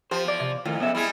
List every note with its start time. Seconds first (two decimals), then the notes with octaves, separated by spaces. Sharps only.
0.11 F3 G4 C5
0.25 E2 D5
0.40 C3
0.65 F2 A2 D#3 F4
0.80 B1 C#3 B3 E5
0.95 G3 G#3 E4 G#4